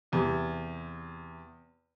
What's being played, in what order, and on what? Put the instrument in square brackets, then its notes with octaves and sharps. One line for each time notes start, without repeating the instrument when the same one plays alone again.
[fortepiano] E2 C3